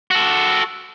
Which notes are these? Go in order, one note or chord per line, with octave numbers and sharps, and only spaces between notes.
F#4 A4